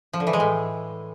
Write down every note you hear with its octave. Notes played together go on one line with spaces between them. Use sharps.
F3
D3
E3
G#3
A2